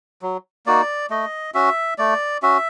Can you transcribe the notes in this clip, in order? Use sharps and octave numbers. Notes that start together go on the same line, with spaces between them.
F#3
A#3 D#4 F#4 D5
A3 D#5
C#4 F#4 E5
A3 D5
C#4 F#4 E5